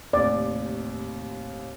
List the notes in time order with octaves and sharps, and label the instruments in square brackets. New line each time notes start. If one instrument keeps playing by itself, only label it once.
[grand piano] D#2 A2 C3 [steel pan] D5